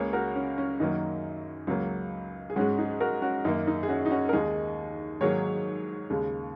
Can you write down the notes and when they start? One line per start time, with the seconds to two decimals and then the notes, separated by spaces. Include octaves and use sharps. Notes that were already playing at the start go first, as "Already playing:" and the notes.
Already playing: C#2 C#3 A#3 G#4 C#5
0.13 F#4 A#4
0.36 C#4
0.58 C#4
0.80 F#2 D#3 F#3 A#3 D#4
1.67 C#2 C#3 F#3 A#3
2.50 G#4
2.56 G#2 G#3 C#4 F#4
2.78 D#4 G#4
3.00 F#4 A#4
3.22 C#4 F#4
3.45 F#2 D#3 A#3 D#4
3.67 D#4
3.83 G#4
3.88 C#4 F#4
4.05 D#4
4.11 C#4 F#4
4.29 A#4
4.33 D#2 D#3 G#3 D#4 G#4
5.21 G#2 D#3 F#3 A#3 G#4 C#5
6.10 D#2 C#3 G#3